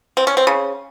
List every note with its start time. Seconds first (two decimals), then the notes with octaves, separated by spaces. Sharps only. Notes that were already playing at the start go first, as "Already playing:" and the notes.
0.17 C4
0.27 C#4
0.37 C4
0.47 C#3